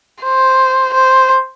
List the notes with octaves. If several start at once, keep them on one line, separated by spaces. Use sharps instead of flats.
C5
C5